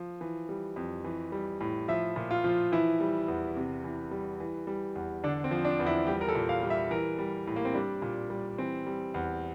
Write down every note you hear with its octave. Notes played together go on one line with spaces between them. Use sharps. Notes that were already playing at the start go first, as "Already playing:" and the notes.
Already playing: F3
E3
G3
F2
E3
G3
A2
F3 E5
A#2
F4
F3
E3 E4
G3
E2
C3
E3
G3
E3
G3
E2
D3 D4
C4
F3
D4
E2
E4
G3 G4
A#4
A4
A#2
F5
G3
E5
E3 A#4
G3
A2
A#3
C4
G3 D4
A#2
G3
E3 C4
G3
E2